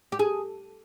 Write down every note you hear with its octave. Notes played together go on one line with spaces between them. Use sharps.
G4
G#4